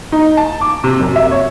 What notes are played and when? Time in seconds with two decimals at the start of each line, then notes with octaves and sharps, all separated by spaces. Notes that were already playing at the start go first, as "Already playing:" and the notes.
0.12 D#4
0.37 A5
0.61 D6
0.84 C3
1.00 F#2
1.16 E5
1.31 C#5